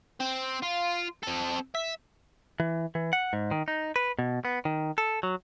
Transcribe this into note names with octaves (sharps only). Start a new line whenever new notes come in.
C4
F4
C4 A4
E5
E3
E3
F#5
G#2
D#3
D#4
B4
B2
B3
D#3
A4
F#3